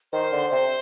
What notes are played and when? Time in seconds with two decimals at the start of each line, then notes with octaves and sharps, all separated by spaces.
0.13 D#3 C5
0.32 D3
0.52 C3